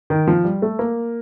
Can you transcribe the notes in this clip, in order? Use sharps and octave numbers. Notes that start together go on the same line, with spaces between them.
D#3
F3
G3
A3
A#3